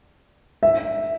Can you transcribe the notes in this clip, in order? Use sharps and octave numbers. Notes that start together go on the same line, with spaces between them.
E5